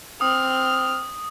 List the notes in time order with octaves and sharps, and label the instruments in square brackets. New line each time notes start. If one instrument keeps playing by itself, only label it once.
[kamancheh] C4 F6 [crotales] D#6